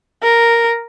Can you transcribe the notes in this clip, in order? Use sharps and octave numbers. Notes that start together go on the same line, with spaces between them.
A#4